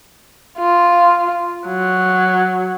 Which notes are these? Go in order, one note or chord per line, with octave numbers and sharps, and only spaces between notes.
F4
F#3